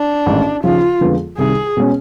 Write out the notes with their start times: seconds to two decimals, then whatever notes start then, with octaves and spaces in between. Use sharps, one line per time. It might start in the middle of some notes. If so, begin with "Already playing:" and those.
Already playing: D4
0.26 A1 G#2 D#3
0.63 D#2 C#3 F3 F4
1.01 F2 D3 F3 G#3 B3
1.37 C2 C3 D#3 G#4
1.77 B2 G#3 C#4